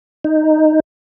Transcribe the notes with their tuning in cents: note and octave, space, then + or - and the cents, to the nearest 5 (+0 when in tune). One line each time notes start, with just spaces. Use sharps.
D#4 -5